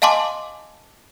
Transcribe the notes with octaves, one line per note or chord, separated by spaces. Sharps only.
D#5 F5 G#5 A5 C6 D6